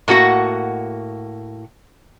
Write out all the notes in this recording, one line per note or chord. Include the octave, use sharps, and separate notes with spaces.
A2 A#3 F#4 F#5